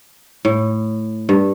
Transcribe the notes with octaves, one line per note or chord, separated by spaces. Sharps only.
A2
G2